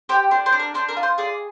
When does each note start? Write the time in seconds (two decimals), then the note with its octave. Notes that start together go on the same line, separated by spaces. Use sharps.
0.09 G4 C5
0.31 D4 C5
0.46 C5
0.52 D4
0.59 A#4
0.74 D4 C5
0.88 A#4
0.97 F4
1.03 C5
1.18 G#4 D5